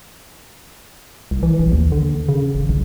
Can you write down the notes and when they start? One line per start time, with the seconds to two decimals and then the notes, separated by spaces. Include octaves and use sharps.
1.31 C2
1.43 E3
1.59 A#1
1.72 D#2
1.92 D3
2.29 C#3
2.55 G#1
2.69 B1